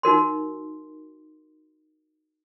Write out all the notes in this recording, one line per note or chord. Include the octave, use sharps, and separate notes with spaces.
D#4 F#4 A#4 C6